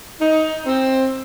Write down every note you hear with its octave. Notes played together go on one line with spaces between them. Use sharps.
D#4
C4